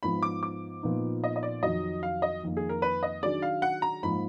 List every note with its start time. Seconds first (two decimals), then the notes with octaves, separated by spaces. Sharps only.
0.03 G#2 F3 B3 B5
0.23 D6
0.43 D6
0.83 A#2 F3 B3 D#4
1.24 D#5
1.36 D#5
1.43 D5
1.63 F2 D#3 F#3 D#5
2.03 F5
2.22 D#5
2.43 F2 D#3 A#3
2.57 G#4
2.69 A#4
2.82 B4
3.03 D#5
3.23 D#3 F#3 D4 G#4 D5
3.42 F5
3.62 F#5
3.82 A#5
4.03 G#2 F3 A#3 B5